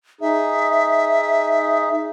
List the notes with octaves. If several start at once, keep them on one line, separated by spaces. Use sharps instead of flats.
D#4 G#4 E5